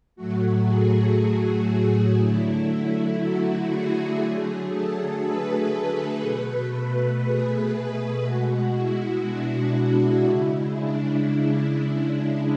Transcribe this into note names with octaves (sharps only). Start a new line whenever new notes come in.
A2 F#3 A3 F#4
G#4
G#4
D3 F#3 A3 E4
E4
F#4
G#4
D3 F#3 A3 G#4
A4
B4
B4
B2 A3
G#4
B2 G#3 F#4
E4
D4
E4
C#3 G#3
D4
D4
E4